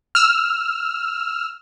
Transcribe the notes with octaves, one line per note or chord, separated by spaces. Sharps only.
E6 F6